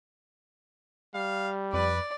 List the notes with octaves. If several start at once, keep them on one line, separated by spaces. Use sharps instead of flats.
G3 F5
F2 B4 D5